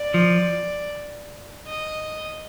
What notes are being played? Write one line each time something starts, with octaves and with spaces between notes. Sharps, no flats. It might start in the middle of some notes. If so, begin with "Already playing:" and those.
Already playing: D5
F3
D#5